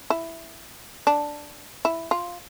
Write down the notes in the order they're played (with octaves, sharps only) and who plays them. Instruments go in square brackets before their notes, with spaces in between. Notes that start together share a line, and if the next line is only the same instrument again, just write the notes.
[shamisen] E4
D4
E4
F4